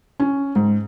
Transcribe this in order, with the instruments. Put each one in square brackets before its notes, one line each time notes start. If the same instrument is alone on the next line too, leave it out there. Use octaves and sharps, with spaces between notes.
[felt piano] C#4
G#2